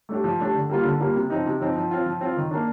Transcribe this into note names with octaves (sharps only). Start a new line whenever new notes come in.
A3 D4 G4
F3
A3 D4 G4
D3
G3 A#3 F4
D3
G3 A#3 F4
C3
F3 C4 D#4
C3
F3 C4 D#4
F3
C4 F4
F3
C4 F4
D#3
A#3 D4